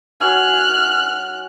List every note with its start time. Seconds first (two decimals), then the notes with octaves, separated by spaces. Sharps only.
0.20 F#3 G#5 F6 F#6